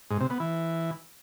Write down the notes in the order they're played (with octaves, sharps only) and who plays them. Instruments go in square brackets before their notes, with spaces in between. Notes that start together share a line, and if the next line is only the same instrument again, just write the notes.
[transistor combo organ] G#2
C3
B3
E3